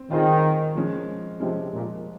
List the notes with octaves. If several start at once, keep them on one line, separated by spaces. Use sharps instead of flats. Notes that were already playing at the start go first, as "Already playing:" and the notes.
Already playing: C4
D#3 C4 F4 G#4 C5 D#5
F3 G#3 C#4
C3 F3 G#3 C#4
A#2